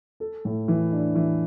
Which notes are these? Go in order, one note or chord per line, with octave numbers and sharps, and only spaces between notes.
A4
A2
E3
D4
E3